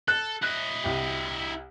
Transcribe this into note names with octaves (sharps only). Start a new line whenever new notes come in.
A4 F#6
E4 D#5 F#6
C2 G4